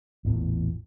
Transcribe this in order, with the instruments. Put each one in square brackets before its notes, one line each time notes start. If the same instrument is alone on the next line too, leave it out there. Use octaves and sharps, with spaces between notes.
[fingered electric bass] A1 E2 A#2